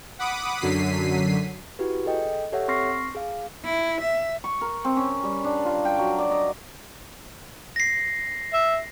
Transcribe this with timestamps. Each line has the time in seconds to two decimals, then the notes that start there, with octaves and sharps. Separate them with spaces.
0.19 F#5 B5 D6 D#6
0.60 F#2 D3 F#3 B6 C7 D#7
1.79 E4 F#4 G4 B4
2.06 G#4 A4 D#5 G5
2.52 G4 A4 C#5 E5 F#5
2.68 C4 C6 C#6 F6 A#6 C7
3.15 G#4 F5
3.64 E4
4.01 E5
4.44 C#6
4.61 A#4
4.85 C4
4.96 C#4
5.23 G3
5.44 D4
5.65 F4
5.85 G5
5.98 F#3
6.18 D5
6.31 D#5
7.76 A#6 C7
8.53 E5